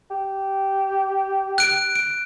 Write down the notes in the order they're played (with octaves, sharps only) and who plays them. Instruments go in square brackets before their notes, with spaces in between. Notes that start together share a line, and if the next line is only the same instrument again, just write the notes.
[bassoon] G4
[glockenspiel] F#6 D7
D7